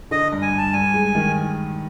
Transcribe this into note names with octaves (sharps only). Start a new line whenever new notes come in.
D3 D#5
G2
G#5
G2 A5
G2 G#5
G#3
D#3